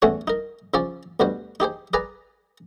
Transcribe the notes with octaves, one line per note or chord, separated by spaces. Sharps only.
E2 A2 A3 C#4 F#4 G#5
D#4 A#4
C#3 F3 C#4 D5
D2 B2 G3 F#4 C5
D#4 G4 G#4 C5
G#4 B4 D5 G#5 A#5